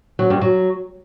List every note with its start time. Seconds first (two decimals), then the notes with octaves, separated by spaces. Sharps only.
0.19 F#3
0.30 G2
0.41 F#3